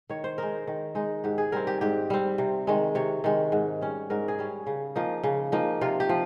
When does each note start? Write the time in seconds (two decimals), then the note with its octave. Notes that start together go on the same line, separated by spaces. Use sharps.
0.09 D#3 C#5
0.24 C5
0.38 G#3 D#4 A#4
0.67 D#3
0.95 G#3 D#4
1.24 G#2 G4
1.38 G#4
1.52 G3 C4 A#4
1.67 G4
1.81 G#2 G4
2.10 G3 C4
2.38 C3
2.67 D#3 G#3
2.95 C3 C#5
3.24 D#3 G#3
3.52 G#2
3.81 G3 C#4
4.10 G#2 A#4
4.28 G#4
4.39 G3 C#4
4.67 C#3
4.96 F3 A#3 D#4
5.23 C#3
5.52 F3 A#3 D#4
5.81 C3 F4
6.00 G4
6.09 F3